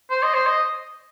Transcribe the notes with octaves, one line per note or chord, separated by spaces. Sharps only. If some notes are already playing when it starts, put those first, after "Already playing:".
C5
D#5
C5
D#5